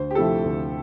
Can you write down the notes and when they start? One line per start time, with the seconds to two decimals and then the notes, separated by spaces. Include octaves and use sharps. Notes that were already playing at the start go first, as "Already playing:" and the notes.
Already playing: D2 C5
0.11 G4
0.15 C3 F3 A3 E4 A4
0.44 D2